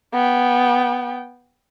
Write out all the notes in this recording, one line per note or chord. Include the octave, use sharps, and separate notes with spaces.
B3 G5